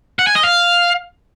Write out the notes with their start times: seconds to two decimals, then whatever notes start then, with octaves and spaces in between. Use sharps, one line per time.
0.19 F#5
0.27 G#5
0.35 D#5
0.43 F5